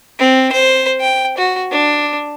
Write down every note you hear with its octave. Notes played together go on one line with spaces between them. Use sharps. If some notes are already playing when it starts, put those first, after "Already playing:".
C4
C5
G5
F#4
D4